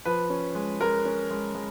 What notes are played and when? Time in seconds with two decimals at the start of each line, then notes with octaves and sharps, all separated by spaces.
0.05 F3 B4
0.30 C#4
0.55 G#3
0.80 G#3 A#4
1.05 C#4
1.31 G#3
1.55 G#3